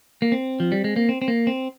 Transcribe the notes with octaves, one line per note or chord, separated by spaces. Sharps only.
A#3
C4
F3
G3
G#3
A#3
C4
C4
A#3
C4